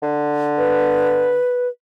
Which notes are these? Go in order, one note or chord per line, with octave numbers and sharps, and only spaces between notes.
D3
B4